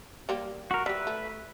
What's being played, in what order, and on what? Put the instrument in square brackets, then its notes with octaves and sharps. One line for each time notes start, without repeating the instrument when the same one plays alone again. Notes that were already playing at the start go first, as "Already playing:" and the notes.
[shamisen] G3 A#3 G4
[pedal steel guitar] F#4 A#4
[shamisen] G3 G4 [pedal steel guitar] B4 E5
[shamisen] A3